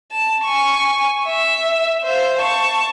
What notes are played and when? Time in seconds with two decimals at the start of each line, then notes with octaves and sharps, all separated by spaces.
0.12 A5
0.44 G#5 C#6
1.26 E5
2.03 C5 F5
2.38 A5 C#6